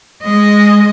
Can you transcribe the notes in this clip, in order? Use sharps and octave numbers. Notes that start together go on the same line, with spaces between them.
G#3 D#5